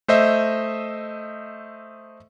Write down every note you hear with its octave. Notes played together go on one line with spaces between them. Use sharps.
A3 C5 D#5 E5